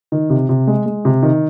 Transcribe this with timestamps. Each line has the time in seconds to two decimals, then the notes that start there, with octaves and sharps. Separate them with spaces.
0.12 D#3
0.30 C3
0.49 C3
0.67 G#3
0.86 G#3
1.05 C3
1.23 D#3